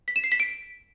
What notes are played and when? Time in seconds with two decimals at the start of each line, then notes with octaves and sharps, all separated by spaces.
0.08 B6
0.16 E7
0.24 C7
0.32 B6
0.40 D7